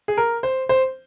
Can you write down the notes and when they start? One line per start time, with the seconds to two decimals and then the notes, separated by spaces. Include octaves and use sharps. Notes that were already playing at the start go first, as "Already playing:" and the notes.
0.08 G#4
0.17 A#4
0.43 C5
0.69 C5